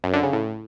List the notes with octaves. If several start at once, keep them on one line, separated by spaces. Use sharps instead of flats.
F#2
D3
C#3
A2